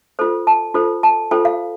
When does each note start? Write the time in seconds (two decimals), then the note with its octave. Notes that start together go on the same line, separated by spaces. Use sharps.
0.19 F4 A4 C5
0.47 A5
0.75 F4 A4 C5
1.03 A5
1.31 F4 A4 C5 G5
1.45 F5